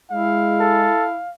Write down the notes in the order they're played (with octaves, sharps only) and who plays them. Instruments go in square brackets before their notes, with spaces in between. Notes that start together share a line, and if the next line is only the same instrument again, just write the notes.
[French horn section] G#3 [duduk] E4 [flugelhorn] F5
[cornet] A4